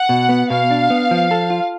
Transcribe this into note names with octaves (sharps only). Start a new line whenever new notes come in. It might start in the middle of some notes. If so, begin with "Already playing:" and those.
Already playing: F#5
B2
B3
B2 F5
D4
B3
F3
A4
F4